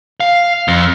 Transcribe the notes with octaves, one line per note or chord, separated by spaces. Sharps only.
F5
F2